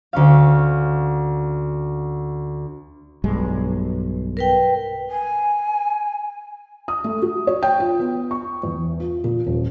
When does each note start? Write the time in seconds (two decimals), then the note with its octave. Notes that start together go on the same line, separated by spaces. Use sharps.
0.13 D2 C#4 F5
3.24 B1 G2 G#3
4.37 A#4 B4 G5
5.09 G#5
6.88 D#6
7.04 A3
7.22 F#4
7.47 C#5
7.63 G5
7.80 F4
7.99 B3
8.31 C#6
8.63 E2
9.00 F4
9.24 A#2
9.46 D#1